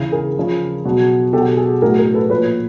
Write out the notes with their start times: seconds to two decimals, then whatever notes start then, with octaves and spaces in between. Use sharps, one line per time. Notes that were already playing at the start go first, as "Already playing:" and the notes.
Already playing: C#3 E3
0.12 G#4 A#4
0.37 C#3 F3
0.85 B2 F#3
1.33 B2 F#3 G4 A4
1.57 G#4
1.82 A2 F#3 G#4 A#4
1.98 G#4 A#4
2.14 A4 B4
2.30 A#2 F3 B4 C#5